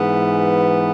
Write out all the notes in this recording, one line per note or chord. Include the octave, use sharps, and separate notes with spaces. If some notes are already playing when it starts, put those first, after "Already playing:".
Already playing: G#2 E3 B3